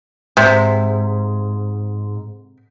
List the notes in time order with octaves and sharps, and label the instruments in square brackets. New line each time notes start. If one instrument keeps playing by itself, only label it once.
[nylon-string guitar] G#2 [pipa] C3